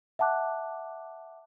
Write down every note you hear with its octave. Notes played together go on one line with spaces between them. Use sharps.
E5 F#5 A5 D6 F#6